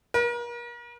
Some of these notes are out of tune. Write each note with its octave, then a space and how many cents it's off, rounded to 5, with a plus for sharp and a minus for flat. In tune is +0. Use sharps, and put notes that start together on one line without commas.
A#4 +40